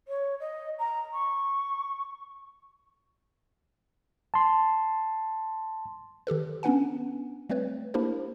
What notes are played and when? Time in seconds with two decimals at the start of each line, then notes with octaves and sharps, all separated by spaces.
0.08 C#5
0.40 D#5
0.79 A#5
1.13 C#6
4.34 A5 C6
6.27 D#3 G4 A4 B4
6.63 B3 C#4 D4 B4 F#5 G#5
7.50 G3 A3 C4 B4 C#5
7.94 A#3 D4 E4 G4 A#4 C5